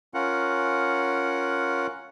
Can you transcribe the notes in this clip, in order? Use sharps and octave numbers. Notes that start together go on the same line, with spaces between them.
C#4 F4 A#4 F#5